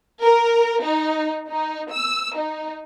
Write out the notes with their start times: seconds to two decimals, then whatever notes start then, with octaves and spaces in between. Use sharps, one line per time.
0.22 A#4
0.83 D#4
1.50 D#4
1.92 E6
2.37 D#4